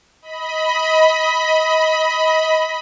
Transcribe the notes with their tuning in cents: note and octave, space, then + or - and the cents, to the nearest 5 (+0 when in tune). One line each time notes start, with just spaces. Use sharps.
D#5 +25 B5 +0